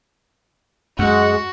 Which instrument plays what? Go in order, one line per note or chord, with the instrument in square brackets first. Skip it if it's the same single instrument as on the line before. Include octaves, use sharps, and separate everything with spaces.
[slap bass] F#2 [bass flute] G#3 [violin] F#4 [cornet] F#5